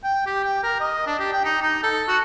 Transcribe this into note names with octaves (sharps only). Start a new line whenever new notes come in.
G5
G4
G5
A#4
D#5
D4
G4
G5
D#4
D#4
A4
F#4